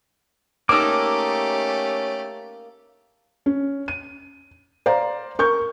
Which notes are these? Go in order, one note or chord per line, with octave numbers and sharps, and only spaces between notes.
A3 A#3 C#4 D#4 G4 D6 E6
C#4
D#7
C5 D5 F5 A#5
A#4 C#6 G6